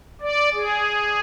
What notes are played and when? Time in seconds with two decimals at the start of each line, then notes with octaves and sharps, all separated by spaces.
0.22 D5
0.54 G#4